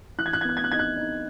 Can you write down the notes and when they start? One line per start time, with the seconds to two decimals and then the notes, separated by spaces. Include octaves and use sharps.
0.18 E3 F#6
0.26 G#6
0.33 F#6
0.41 G#6
0.44 B3 F#6
0.57 G#6
0.64 F#6
0.72 D#4 G#6
0.79 F#6
0.97 D#4